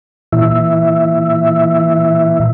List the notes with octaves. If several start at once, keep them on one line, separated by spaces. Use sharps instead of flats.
A#2 E3 E5